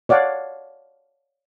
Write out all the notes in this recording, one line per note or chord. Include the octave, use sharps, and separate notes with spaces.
C#5 D5 F5 F#5 A5